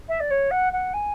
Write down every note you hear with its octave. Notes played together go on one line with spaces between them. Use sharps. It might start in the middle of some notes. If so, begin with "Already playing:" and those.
E5
D5
C#5
F#5
F#5
G#5